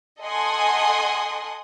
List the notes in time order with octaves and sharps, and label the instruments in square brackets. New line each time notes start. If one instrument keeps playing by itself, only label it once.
[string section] A4 D#5 F#5 G#5 C6 D#6